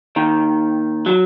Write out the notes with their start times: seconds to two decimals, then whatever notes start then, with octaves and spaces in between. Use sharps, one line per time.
0.16 D#2 D#3
1.06 F#3